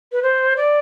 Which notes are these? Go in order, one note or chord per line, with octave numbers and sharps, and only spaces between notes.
B4
C5
D5